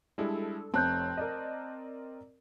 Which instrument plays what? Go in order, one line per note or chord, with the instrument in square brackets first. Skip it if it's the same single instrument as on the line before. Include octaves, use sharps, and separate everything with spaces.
[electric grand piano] G3 G#3 E4 [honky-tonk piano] D4 A4
[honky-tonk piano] F1 C#5 [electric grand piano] C4 [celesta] A5 F#6 G6
[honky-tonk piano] A#4 D5 D#5